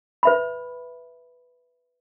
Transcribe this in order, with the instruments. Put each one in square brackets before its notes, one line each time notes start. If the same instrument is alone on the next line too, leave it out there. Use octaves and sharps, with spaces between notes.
[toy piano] B4 E5 B5